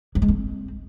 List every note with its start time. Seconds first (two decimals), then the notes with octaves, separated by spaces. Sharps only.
0.15 F#3
0.22 G#3
0.28 C4